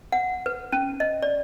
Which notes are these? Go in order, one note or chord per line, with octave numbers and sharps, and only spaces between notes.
F#5
B4
C#4
D#5
D5